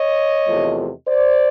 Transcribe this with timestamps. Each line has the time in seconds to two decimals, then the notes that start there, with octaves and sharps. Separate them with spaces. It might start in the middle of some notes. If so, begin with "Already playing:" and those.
Already playing: C#5 D#5
0.47 E2 C3 F3 A3
1.08 C5 D5